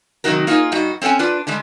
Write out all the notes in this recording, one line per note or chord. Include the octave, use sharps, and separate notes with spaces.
C3 D#3 F#3 D#4 F#4 A#4
A#3 D#4 F4 F#4 G#4 A#4
G2 D#4 F#4
C4 C#4 A4 F#5 G#5
D4 F4 B4
D3 G3 G#3